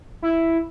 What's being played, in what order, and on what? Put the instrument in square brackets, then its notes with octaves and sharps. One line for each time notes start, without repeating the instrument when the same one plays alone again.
[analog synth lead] E4